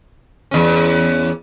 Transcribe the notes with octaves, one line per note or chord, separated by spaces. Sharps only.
E2 C#4